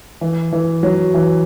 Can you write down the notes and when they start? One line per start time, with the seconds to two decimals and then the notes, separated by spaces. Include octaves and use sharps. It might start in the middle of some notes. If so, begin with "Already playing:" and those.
0.21 E3
0.53 E3
0.83 F#3
1.14 E3